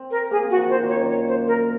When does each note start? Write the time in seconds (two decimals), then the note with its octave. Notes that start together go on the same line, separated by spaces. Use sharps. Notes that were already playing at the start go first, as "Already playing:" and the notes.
Already playing: C4
0.11 A#4
0.31 A#3 G#4
0.43 C4
0.51 F#4
0.56 F3
0.69 D#3 C5
0.82 A#2
0.88 C#5
0.96 F#2
1.08 C#5
1.28 C5
1.47 A#4